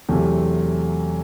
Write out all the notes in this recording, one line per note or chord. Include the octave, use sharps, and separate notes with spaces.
E2 C3 F#3 A3